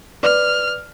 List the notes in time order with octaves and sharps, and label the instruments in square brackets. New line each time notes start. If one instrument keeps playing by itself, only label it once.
[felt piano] B4 D5 [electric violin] F6